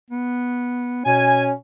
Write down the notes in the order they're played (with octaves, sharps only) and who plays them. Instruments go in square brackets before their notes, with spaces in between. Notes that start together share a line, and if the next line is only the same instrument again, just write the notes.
[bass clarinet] B3
[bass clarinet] B2 [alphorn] C#4 [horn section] G#5